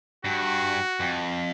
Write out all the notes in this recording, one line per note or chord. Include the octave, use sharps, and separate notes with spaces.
G2 F#4
F2